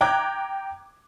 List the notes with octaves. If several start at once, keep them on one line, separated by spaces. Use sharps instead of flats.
G5 A#5 D6 F#6 G#6